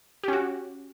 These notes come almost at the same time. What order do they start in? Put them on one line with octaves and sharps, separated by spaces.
G4 C#4 F#4